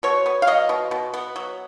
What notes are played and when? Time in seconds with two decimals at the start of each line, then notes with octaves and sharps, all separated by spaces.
0.03 B2 C#5
0.26 B3
0.42 F5
0.47 F#3 D#5
0.69 B2
0.91 B2
1.14 B3
1.36 F#3